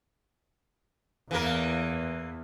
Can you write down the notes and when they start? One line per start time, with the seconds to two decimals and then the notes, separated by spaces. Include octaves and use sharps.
1.31 E2 E3 A#3 A#4